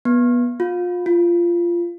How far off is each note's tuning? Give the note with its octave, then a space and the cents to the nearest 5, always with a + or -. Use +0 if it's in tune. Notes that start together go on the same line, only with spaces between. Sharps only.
B3 -20
F4 +30
F4 -15